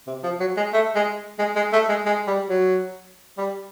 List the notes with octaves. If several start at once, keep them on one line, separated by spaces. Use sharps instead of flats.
C3
F3
F#3
G#3
A3
G#3
G#3
G#3
A3
G#3
G#3
G3
F#3
G3